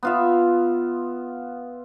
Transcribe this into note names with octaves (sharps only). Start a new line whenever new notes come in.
B3 F4 E5